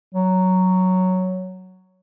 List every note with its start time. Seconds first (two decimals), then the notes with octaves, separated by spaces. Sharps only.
0.14 F#3